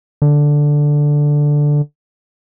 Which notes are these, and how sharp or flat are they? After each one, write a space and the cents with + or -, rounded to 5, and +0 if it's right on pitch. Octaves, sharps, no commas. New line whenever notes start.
D3 +0